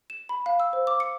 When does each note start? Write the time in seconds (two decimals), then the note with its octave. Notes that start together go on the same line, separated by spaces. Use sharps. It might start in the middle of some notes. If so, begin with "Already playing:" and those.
0.10 E7
0.29 B5
0.46 F5
0.60 E6
0.73 C5
0.87 D6
1.00 C#7